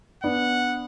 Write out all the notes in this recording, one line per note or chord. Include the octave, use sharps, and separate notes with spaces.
B3 D4 F#5